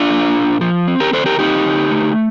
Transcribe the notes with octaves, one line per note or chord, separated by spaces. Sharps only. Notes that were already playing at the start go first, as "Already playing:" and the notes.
Already playing: D4 F4
A#3
A#2
F3
C4
G4 A#4
D3 A4 C5
G4 A#4
C4 D#4 G4
D3
A3